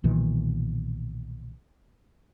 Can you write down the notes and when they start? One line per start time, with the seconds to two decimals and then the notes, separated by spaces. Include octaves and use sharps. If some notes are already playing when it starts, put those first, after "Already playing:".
0.04 B1 A#2 D#3 E3